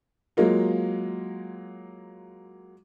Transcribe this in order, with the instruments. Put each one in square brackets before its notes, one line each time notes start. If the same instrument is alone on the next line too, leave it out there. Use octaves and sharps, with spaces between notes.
[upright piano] F#3 G#3 A#3 F4